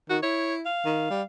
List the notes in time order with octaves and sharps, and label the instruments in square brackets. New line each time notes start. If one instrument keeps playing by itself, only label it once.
[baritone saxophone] D#3 [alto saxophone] F#4
[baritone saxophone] E4 [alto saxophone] C#5
[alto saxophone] F5
[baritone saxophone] D#3
G3